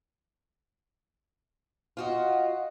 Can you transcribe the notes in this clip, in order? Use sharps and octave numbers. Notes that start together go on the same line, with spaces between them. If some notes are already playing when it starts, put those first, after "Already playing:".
F4 F#4 D#5